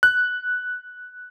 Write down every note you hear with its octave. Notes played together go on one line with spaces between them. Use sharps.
F#6